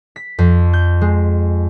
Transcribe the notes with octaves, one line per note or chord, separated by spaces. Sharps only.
B6
F2
G6
G#3